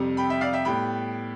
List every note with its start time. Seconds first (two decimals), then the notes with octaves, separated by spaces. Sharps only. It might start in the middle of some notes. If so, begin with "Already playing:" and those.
Already playing: F2 C3 G3
0.17 G5 B5
0.30 E5 G5
0.41 D5 F5
0.53 E5 G5
0.65 A2 G3 B3 G5 B5